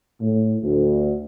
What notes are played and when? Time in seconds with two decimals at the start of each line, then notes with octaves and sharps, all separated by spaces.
0.21 A2
0.62 D2